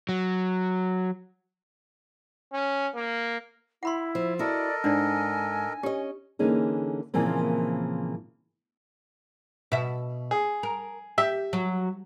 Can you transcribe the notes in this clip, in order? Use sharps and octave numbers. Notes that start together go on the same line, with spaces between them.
F#3
C#4
A#3
E4 F#5 B5 C6
F3
E4 F#4 A4 A#4 D5 D#5
G#2 D4 D#4 D5 G#5
C#4 G4 D#5
D3 E3 A#3 C#4 D#4 G#4
A#2 C#3 E3 F3 A#3 C4
B2 E5
G#4
A#4
G4 E5
F#3